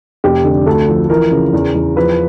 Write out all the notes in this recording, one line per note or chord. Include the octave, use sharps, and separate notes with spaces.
F1 G4
D3
D2 A4
F3
E3 A#4
C#3
E2
E2
F3 B4